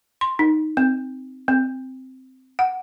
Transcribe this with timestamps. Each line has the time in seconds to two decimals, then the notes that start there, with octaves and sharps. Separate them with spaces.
0.21 C6
0.39 D#4
0.77 C4
1.48 C4
2.59 F#5